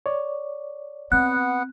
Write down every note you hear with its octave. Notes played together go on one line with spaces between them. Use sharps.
C#5 D5
B3 C4 F#5 F#6